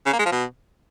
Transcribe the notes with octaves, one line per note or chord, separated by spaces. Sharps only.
C#3
A#3
G#3
F3
B2